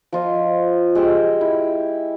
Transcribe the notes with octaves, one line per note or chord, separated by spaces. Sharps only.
F3 F4 D#5
G#3 G4 G5 E6
E4